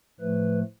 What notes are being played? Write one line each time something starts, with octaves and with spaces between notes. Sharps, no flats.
A2 F3 A3 B4